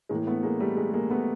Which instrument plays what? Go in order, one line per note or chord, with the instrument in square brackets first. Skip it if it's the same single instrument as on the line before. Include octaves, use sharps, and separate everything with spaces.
[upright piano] A2 E3 G#3 A#3
A3 B3
G#3 A#3
G3 A3
G#3
G#3 A#3
A3 B3